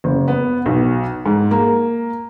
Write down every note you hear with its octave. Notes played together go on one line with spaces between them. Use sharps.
F#1
B3
B1
G#2
A#3